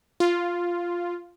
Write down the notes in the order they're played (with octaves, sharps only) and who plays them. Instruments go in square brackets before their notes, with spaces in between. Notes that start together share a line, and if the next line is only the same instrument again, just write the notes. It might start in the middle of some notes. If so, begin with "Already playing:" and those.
[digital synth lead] F4